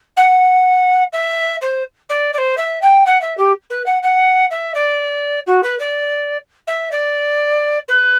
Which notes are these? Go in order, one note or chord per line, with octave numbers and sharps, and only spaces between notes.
F#5
E5
C5
D5
D5
C5
E5
G5
F#5
E5
G4
B4
F#5
F#5
E5
D5
F#4
B4
D5
E5
D5
B4